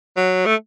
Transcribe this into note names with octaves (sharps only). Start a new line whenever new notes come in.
F#3
A3